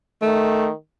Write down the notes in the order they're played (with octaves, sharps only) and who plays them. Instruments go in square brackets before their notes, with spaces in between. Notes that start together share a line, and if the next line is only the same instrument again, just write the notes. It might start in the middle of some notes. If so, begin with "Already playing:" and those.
[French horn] D#3 [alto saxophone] A3